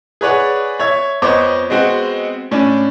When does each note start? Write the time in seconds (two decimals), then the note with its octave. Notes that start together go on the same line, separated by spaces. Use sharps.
0.21 G#4 B4 C#5 D5 F#5
0.80 C#5 E5 G#6
1.22 F2 B3 C5 C#5 D#5 D6
1.70 G#3 B3 C4 F#4
2.51 A2 C#4 D4